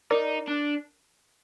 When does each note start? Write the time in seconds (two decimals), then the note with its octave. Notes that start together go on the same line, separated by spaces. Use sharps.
0.11 D#4 A#4 D5
0.47 D4